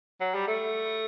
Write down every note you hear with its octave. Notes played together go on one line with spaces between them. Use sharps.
F#3
G3
A3